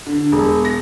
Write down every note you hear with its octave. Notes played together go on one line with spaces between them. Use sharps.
D3
E1
A#6